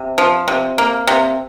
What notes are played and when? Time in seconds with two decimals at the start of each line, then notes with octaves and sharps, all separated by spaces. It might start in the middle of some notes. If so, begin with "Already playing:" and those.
Already playing: C3
0.18 F3
0.48 C3
0.78 A#3
1.07 C3